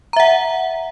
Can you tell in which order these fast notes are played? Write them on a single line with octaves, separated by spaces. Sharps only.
A#5 E5 F#5